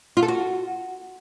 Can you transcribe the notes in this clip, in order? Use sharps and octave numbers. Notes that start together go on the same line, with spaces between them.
F4
A4
F#4